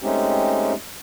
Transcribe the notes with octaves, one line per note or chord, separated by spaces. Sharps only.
G#3 A3 C4 C#4 D#4 G4